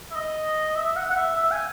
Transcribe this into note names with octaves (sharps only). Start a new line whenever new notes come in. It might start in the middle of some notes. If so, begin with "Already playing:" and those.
E5
D#5
E5
F#5
F#5
E5
E5
G#5